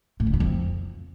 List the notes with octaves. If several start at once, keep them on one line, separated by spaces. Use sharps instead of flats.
A2
D3
E2
F2